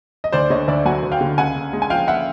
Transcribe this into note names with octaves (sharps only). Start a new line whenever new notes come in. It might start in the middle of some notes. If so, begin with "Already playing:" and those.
D#5
D2 C5 D5
D3 C#5 D#5
D2 D5 E5
F#3 F#5 G#5
D2
F5 G5
D3
C#2 F#5 G#5
C#3
G#3
G#5
F3 F5 G5
E5 F#5